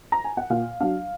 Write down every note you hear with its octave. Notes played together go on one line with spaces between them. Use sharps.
A#5
G#5
F#5
A#2 F5
F#3 D4 F5